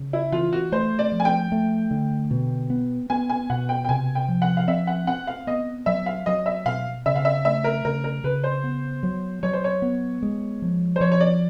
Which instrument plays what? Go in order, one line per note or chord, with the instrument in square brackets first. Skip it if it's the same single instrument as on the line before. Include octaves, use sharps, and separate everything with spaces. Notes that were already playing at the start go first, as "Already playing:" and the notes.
Already playing: [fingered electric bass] C#3
[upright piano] E4
[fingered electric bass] E3 [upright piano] F4
[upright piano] F#4
[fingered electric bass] A3 [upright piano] C5
[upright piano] D5
[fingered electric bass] F3
[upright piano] G#5
G5
[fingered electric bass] A3
D3
B2
B3
[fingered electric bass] B3 [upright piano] G#5
[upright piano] G#5
[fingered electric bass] B2 [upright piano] F#5
[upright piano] G5
G5
[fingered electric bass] C3 [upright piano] G#5
[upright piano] G5
[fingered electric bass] F3
[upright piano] F#5
F5
[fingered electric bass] C4 [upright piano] E5
[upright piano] F#5
[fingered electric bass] C4 [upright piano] F#5
[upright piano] F5
[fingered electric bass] B3 [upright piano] D#5
[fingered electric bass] F#3 [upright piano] E5
[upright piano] F5
[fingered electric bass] F#3 [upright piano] D#5
[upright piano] E5
[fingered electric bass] B2 [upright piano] F5
[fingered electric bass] C#3 [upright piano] E5
[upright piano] F5
E5
[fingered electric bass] A3 [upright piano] E5
[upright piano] A#4
[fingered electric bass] C#3 [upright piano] A#4
[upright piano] A#4
[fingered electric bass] C#3 [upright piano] B4
[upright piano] C5
[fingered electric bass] B3
F#3
[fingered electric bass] F#3 [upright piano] C#5
[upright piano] C5
C#5
[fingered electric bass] B3
G#3
F3
[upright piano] C5
[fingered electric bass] F3 [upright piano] C#5
[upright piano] C#5
D5